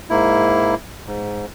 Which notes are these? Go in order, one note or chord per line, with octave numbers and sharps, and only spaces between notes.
G#2 A#3 E4
G#2